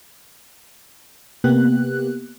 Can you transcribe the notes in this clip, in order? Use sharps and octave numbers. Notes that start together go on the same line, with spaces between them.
C3 A#3 B3 G4 F#6